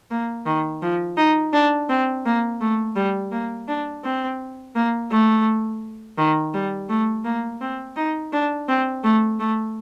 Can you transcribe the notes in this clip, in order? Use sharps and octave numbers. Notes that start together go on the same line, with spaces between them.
A#3
D#3
F3
D#4
D4
C4
A#3
A3
G3
A#3
D4
C4
A#3
A3
D#3
G3
A3
A#3
C4
D#4
D4
C4
A3
A3